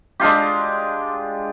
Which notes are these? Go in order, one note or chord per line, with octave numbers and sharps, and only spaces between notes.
G#3 D4 F4 G4